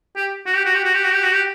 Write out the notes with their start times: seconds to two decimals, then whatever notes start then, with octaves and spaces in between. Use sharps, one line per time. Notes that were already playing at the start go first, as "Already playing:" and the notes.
0.16 G4
0.46 F#4
0.55 G4
0.65 F#4
0.74 G4
0.84 F#4
0.94 G4
1.04 F#4
1.13 G4
1.23 F#4
1.32 G4